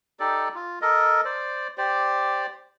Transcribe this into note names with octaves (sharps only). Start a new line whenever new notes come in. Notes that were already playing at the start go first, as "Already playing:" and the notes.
D#4 G4 A4 D5
F4
A4 A#4 D#5
C5 D5
G4 C5 D5